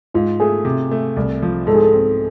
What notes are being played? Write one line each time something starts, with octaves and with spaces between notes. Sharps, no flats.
G#2 F4
A3 G#4
C3
A3
C2
F3
G#2 A4
G#4
A4
C4